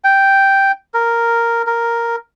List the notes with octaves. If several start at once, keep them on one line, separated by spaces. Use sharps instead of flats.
G5
A#4
A#4